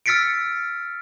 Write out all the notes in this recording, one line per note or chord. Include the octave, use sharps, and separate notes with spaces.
E6 F6 A6 B6 C#7 D7